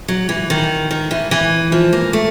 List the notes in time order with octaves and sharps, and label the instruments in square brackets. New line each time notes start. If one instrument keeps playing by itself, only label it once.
[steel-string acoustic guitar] F#3
E3
D#3
D#3
E3
E3
F3
A#3
A3